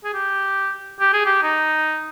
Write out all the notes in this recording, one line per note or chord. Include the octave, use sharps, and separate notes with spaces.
G#4
G4
G4
G#4
G4
D#4